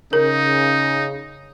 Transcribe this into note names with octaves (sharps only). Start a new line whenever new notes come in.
C#3 D#4 A#4